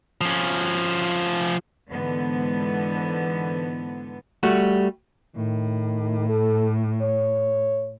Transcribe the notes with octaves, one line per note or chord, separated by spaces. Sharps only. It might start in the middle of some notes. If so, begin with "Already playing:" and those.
F3 C#4
G#2 D3 E3 B3
G3 A3 F#4
A2 D#3
A4
C#5